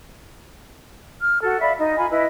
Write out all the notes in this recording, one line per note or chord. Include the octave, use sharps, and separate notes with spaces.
F6
F#4 A4
D5 E5 F5 B5
D#4 D#5
F4 G#5 B5
E4 B4 D#5